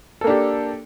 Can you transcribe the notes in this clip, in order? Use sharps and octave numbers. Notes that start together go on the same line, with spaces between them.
A#3 D4 G4 A4